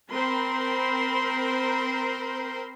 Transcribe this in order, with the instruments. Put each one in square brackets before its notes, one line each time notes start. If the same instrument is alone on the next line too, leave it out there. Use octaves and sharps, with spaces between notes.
[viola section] C4 A#4 C5 B5 C6